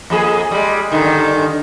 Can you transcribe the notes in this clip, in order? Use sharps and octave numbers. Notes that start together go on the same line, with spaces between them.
F2 A#3 G#4
G3 G#3
G2 D3 D#3